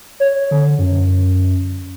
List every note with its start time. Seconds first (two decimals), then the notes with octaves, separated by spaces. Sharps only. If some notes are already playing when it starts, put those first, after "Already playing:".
0.20 C#5
0.51 D3
0.79 F#2